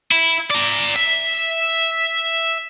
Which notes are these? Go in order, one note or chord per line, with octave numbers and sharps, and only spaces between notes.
E4
D5 A#5
E5